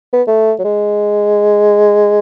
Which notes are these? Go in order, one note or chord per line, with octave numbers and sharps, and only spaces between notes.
B3
A3
F#3
G#3